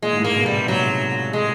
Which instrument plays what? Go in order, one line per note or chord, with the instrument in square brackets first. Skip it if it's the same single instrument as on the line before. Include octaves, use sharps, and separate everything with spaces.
[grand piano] A#2 [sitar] G#3
[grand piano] G#2
A2
[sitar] A#3
[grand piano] B2
[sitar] G3
[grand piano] C3
[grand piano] A#2 [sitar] F#3
[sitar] G#3